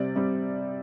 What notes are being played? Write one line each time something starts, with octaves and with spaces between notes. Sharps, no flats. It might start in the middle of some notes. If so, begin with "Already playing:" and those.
Already playing: C3 G3 C4 D5
C3 G3 C4